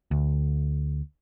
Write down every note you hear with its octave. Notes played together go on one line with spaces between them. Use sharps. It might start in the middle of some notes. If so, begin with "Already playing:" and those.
D2